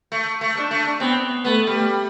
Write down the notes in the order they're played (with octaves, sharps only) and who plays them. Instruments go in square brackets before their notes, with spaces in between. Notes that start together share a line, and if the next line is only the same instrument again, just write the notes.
[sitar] A3
A3
[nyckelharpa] D4
[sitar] A3
[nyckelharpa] B3 [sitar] C4
[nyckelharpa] A3 [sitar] B3
[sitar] G3